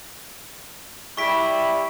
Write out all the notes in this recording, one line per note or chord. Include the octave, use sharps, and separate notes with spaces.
G3 E4 C#6 B6 D7